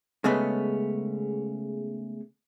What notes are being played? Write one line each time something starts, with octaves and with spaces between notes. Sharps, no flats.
C#3 G#3 A3 B3 C#4